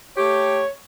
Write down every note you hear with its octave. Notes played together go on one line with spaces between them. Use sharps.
A3 G4 C#5